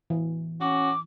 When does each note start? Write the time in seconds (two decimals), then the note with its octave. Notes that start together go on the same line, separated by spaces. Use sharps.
0.10 E3
0.61 C#4 F#4 D6